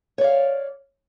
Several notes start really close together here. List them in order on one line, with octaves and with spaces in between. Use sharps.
C#5 D5 F5